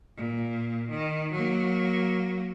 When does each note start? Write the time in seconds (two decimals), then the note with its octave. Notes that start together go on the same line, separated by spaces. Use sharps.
0.17 A#2
0.90 D#3
1.33 F#3 A#3